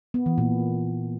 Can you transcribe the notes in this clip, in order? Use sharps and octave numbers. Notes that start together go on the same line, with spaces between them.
B3
E3
A#2